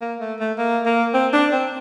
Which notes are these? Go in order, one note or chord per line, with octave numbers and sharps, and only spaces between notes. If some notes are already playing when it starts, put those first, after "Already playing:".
A#3
A3
A3
A#3
A#3
C4
D4
C4